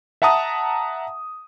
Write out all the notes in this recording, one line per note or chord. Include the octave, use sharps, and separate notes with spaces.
E5 F#5 A5 A#5 D#6